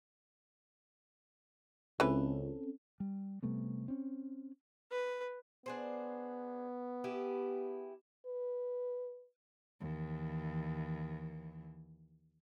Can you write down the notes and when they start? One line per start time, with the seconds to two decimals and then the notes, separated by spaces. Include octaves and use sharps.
2.00 C#2 E3 C4 C#4 A4 B4
3.00 G3
3.42 C3 G3 A3 B3
3.88 C4 C#4
4.91 B4
5.66 B3 D4 G#4 C5
7.04 E4 G4 G#4
8.26 B4
9.81 D#2 E3